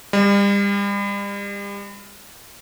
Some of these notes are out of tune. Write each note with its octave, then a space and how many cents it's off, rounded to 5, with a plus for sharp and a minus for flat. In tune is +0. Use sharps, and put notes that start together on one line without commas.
G3 +40